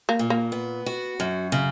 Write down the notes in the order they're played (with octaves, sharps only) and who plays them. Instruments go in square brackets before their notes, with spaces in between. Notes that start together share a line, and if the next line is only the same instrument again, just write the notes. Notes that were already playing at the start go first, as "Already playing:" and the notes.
[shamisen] A#3
[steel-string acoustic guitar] A#2
[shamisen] A#3
[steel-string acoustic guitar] B3
F#4
F#2
C#3